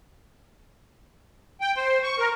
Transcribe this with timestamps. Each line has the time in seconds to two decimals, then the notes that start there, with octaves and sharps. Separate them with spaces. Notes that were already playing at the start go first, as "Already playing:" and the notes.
1.61 G5
1.76 C5
2.03 C#6
2.19 A#4